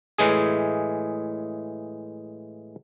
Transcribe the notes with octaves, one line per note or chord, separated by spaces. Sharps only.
A2 E3 G#3 G#4